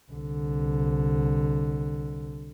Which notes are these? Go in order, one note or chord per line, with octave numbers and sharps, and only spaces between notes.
C2 D3